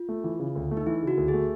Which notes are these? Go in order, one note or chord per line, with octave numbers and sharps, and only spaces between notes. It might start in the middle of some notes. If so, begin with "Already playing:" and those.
Already playing: F4
A3
E3
C#3
D2
A3
D#4
E3 E4
C#3 F#4
D2
G#4
A3